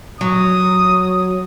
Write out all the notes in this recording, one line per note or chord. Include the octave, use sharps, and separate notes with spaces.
F#3 D#6